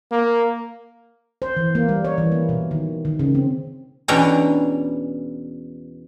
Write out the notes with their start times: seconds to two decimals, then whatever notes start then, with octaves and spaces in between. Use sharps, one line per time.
0.11 A#3
1.42 C5
1.57 E3
1.75 A#3
1.89 G3
2.05 C#5
2.18 E3
2.32 A#3
2.49 B2
2.71 D#3
3.05 D#3
3.19 C#3
3.35 C4
4.08 E2 B2 C#4 D4 G5 A#5